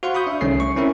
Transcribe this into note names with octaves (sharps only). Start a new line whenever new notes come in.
F#4 C5 F5 F#5 C6
B5 C#6 D#6 G6
D4 E5
C2 D#3 A3 C#4 C7
C#6
C4 C#4 E4 A#4 E5